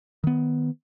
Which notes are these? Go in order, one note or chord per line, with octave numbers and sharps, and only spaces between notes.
D#3 B3